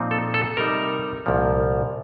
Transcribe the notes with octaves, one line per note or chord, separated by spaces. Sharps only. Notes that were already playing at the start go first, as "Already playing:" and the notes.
Already playing: A#2 F3 C4 D#4
A4
A4
C3 G3 C4 D#4 A#4
C2 A#2 F3